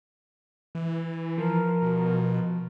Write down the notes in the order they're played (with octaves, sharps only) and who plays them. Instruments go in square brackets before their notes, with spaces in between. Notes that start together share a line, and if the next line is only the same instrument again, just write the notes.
[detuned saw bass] E3
[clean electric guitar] F3 [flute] A#4
[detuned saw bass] B2